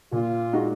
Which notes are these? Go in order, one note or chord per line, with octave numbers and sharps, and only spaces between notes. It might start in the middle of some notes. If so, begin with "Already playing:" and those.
A#2 F4
G#3 D#4 F#4